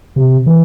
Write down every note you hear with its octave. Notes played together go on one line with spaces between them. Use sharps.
C3
E3